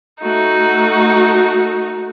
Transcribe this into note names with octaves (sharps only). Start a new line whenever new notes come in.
A3 D#4 F#4